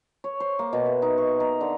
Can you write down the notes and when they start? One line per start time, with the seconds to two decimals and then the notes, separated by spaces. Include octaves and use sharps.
0.24 C#5
0.40 C5
0.59 A#3
0.73 B2
0.86 E5
1.02 D#4
1.18 C#6
1.40 A#4
1.61 D3